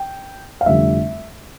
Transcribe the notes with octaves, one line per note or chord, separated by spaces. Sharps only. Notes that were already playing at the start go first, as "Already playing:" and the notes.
Already playing: G5
F5
F1 F2 D3 G3 E5